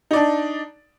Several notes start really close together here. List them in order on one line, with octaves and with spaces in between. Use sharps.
D#4 D5 D4